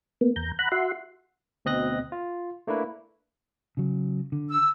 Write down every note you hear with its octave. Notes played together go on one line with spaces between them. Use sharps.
A#3 B3
E2 A#5 G6
F#5 A#5 B5 F#6
F#4 E5 F#5 C6
D2 B2 C4 D#5 F#6 A#6
F4
A3 A#3 D4 E4 B4
C#3 F#3
D3
E6